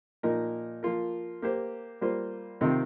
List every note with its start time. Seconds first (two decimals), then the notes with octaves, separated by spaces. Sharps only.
0.23 A#2 F3 D#4 A#4
0.83 F3 A#3 F4 A#4
1.42 A#3 G4 C5
2.01 G3 A#3 F4 C5
2.61 C3 D#3 C4 F4